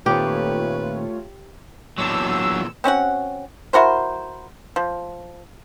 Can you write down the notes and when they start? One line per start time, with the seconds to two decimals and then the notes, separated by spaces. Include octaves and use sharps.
0.06 A#2 D#3 A3 C4 F4 G4 B4 C#5
1.98 E2 A#2 F#3 D4 E6
2.84 C4 C#4 F#4 F#5
3.73 E4 F#4 A#4 C5
4.76 F3